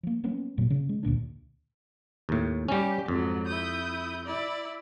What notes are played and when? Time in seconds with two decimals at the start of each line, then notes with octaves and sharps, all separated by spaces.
0.03 F3 A#3
0.24 F#3 A#3 B3 C#4
0.57 E1 A#2 F#3
0.70 C#3
0.89 G#3
1.03 D2 A#2 B3 D4
2.29 D#2 A2
2.68 G3 C#4 G4
3.08 F2 G#2 F#3
3.46 E4 D#6 G6
4.26 E4 D5